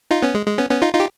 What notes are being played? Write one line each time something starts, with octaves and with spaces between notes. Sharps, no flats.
D#4 F4
B3 C#4
G#3
G#3
B3 C#4
B3 C#4
D#4 F4
D#4 F4
G4